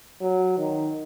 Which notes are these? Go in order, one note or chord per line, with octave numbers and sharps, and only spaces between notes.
F#3
D#3